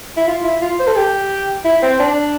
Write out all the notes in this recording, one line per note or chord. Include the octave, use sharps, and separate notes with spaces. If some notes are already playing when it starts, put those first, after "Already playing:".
E4
F4
E4
F4
C5
A4
G4
E4
C4
D4